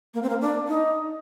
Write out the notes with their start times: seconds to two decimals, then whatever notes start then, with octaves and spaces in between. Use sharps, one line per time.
0.14 A#3
0.22 C4
0.29 A#3
0.41 D4
0.68 D#4